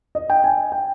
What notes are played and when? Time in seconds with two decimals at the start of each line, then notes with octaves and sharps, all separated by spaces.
0.15 D#5
0.30 G5
0.44 G#5
0.72 G5